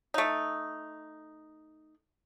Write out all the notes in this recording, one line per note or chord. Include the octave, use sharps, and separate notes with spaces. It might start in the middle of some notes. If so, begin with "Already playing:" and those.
A3 D#4